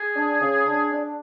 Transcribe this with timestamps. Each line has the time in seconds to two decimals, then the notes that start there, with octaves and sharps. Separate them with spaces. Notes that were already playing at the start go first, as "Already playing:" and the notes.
Already playing: G#4
0.16 D4
0.41 C#3
0.66 D4
0.91 D4